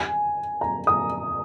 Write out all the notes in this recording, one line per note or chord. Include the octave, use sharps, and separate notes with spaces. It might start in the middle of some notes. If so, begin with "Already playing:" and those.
Already playing: G#5
A#5
D#6